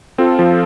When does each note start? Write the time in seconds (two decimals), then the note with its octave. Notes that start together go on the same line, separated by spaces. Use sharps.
0.18 C4 F4 A4
0.39 F3